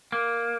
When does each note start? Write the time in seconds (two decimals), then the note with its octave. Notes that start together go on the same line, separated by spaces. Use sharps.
0.12 A#3